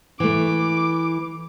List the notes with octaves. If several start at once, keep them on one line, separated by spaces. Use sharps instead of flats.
E3 A3 D6